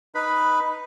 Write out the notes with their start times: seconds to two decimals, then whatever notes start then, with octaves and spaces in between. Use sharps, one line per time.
0.15 D#4 B4 B5